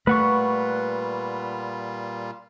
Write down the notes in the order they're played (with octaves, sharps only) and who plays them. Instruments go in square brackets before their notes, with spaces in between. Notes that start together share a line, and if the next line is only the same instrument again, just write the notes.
[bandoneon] A#2 G3 F4 [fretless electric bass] A3 [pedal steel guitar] B4 F#5 C#6